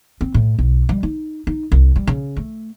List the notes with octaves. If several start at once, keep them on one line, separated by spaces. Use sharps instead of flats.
C4
A2
B1
G3
D#4
D#4
C2
G3
C#3
A3